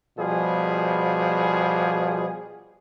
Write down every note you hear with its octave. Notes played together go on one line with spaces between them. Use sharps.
B2 F3 G3 G#4